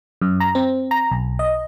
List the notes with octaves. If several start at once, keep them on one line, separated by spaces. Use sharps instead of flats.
F#2
A#5
C4
A#5
B1
D#5